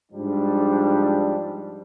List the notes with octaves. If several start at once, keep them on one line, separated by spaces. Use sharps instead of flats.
G#2 F3 G3 D4